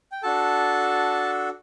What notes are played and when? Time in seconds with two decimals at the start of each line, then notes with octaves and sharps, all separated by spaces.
0.12 G5
0.23 D4 F#4 A4 A5